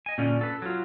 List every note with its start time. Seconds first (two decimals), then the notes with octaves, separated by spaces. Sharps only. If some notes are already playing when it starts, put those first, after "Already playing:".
0.06 D#5 G#5
0.18 A#2 D3 C#4 D5
0.41 A4 B4
0.62 F#3 F4